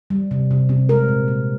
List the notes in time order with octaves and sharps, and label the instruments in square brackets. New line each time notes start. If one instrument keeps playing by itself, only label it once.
[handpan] G3
C3
C3
C3
G#3 A#4
A#2
A#2